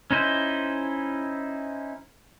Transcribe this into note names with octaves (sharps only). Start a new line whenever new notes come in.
C#4 D#4 E4 C5